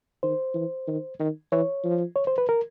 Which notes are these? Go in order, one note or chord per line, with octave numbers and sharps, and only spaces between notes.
D#3 C5
E3
D#3
D#3
E3 C#5
F3
C#5
C5
B4
A#4